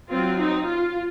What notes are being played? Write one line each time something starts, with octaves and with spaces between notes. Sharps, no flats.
F#3 C4 F4
D#4
F4